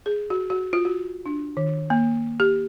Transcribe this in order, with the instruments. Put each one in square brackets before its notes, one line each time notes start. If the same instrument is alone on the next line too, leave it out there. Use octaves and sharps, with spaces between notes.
[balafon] G#4
F#4
F#4
F4
F#4
D4
D#3
A#3
G4